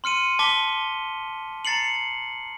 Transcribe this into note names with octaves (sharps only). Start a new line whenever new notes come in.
C6 F6 C#7 D#7
A5 D6 B6 G7
A#5 A6 C7 C#7 F#7